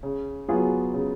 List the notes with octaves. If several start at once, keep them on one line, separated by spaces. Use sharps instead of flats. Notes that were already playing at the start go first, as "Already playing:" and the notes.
C#3
F#3 B3 F4 G#4
C#3